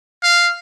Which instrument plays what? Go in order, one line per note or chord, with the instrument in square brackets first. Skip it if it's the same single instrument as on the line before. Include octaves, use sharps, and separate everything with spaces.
[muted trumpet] F5